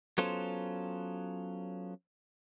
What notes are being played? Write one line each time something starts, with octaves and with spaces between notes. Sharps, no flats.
F#3 B3 C#4 F4 A4 C5